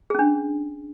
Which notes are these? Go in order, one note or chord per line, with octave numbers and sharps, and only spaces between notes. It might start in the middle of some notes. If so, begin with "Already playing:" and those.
C#4 D4 G#4